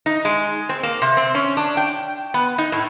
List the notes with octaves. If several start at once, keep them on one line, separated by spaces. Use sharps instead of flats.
D#4
G#3
C4
A#3
C3
C4
C#4
D4
G5
B3
D#4
A2